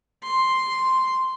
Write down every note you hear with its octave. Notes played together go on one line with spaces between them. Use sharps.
C6